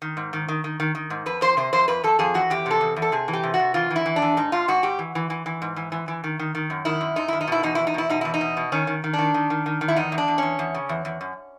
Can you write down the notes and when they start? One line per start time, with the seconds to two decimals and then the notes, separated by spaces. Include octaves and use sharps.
0.02 D#3
0.17 G#2
0.33 D#3
0.48 D#3
0.64 D#3
0.80 D#3
0.95 D#3
1.10 G#2
1.26 F2 B4
1.41 F2 C5
1.57 C3 C5
1.73 F2 C5
1.88 F2 B4
2.04 F2 A4
2.19 F2 G#4
2.34 E3 F#4
2.50 E2 G4
2.66 C3 A4
2.81 E2
2.96 E2
3.02 A4
3.12 C3 G#4
3.28 E3
3.33 G4
3.43 C3
3.54 F#4
3.59 C3
3.74 E3 F4
3.90 E3
3.96 E4
4.06 E3
4.16 D4
4.22 E3
4.37 G#2 D#4
4.52 G#2 F4
4.68 G#2 F#4
4.83 G#2 G4
4.99 E3
5.15 E3
5.30 E3
5.46 E3
5.62 G#2
5.76 E3
5.92 E3
6.08 E3
6.24 D#3
6.39 D#3
6.55 D#3
6.70 F#2
6.85 D#3 E4
7.01 F#2
7.16 F#2 D#4
7.28 D#3 E4
7.41 D#4
7.47 B2 E4
7.63 E2 D#4
7.75 E2 E4
7.87 D#4
7.94 B2 E4
8.10 B2 D#4
8.21 E2 E4
8.34 D#4
8.41 B2
8.57 B2
8.72 D#3 C#4
8.87 D#3
9.04 D#3
9.13 D4
9.19 D#3
9.34 D#3
9.50 D#3
9.66 D#3
9.81 D#3
9.88 E4
9.96 E2 D#4
10.12 E2
10.18 D4
10.28 E2
10.38 E2 C#4
10.59 E2
10.74 C#3
10.89 E2
11.05 E2
11.21 F#2